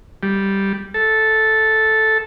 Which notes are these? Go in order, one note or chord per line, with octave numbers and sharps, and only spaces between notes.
G3
A4